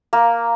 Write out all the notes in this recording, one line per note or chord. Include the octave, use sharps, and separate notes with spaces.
A#3